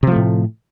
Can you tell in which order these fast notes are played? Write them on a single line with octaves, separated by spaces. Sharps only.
C3 F3 A3 A2